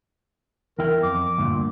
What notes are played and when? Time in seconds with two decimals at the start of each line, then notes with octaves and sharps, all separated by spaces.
0.79 E2 E4 A#4 G5
1.03 F2 D6
1.38 D2 G2 A#2